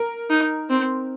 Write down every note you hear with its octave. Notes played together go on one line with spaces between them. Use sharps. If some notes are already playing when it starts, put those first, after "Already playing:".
Already playing: A#4
D#4
C4